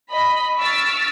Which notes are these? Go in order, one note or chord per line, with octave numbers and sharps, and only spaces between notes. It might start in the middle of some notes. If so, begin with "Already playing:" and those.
D#5 B5
C#6 E6 F6 A6 B6 D7